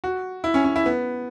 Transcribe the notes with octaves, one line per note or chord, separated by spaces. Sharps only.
F#4
E4
C#4
C#4
E4
B3